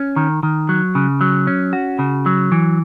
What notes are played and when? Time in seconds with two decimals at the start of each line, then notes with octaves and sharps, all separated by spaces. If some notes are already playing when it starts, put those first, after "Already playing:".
Already playing: C#4
0.16 D#3
0.43 D#3
0.69 F#3
0.95 C#3
1.21 F#3
1.47 C#4
1.73 F#4
1.99 C#3
2.26 F#3
2.52 E3